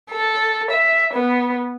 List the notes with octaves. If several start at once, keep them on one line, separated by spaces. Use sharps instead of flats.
A4
E5
B3